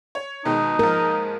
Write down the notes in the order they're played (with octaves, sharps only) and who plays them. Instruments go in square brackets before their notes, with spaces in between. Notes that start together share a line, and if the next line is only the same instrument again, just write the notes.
[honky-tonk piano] C#5
[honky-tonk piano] B2 D#3 G#3 [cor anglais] D#4
[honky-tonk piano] G#2 F3 [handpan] A#4